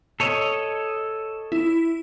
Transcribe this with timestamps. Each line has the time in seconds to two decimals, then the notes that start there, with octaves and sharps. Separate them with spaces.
0.20 A4 C#5 D#5
1.52 E4